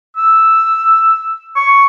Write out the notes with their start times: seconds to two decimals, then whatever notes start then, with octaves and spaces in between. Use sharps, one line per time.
0.17 E6
1.56 C#6